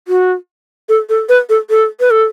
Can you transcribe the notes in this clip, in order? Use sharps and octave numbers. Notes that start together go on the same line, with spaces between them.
F#4
A4
A4
B4
A4
A4
B4
A4